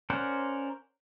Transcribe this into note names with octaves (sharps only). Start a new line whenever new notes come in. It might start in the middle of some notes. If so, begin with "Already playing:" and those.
C#4 A#4 C5 D5 F#5